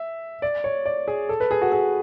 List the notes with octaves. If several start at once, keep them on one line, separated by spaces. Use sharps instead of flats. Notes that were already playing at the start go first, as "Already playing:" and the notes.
Already playing: E5
D5
C#5
D5
G#4
A4
B4
G#4
F#4
G#4